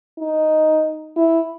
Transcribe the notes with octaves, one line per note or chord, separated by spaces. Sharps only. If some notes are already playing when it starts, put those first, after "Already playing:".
D#4
E4